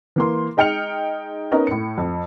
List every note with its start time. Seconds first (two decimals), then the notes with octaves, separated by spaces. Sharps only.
0.16 E3 A#3 C6
0.57 G#3 D#4 G5 F6 C#7 F7
1.51 B3 C#4 D#4 A#4
1.67 A2 C#7
1.98 F2